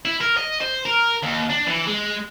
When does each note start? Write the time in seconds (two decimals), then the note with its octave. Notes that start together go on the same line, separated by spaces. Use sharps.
0.05 E4
0.21 A#4
0.37 D#5
0.61 C5
0.85 A#4
1.23 D#2
1.50 D4
1.67 E3
1.87 G#3